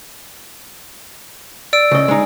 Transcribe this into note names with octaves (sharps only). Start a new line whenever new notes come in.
D5 E6 D7
C#3 D#5
G#3 D#4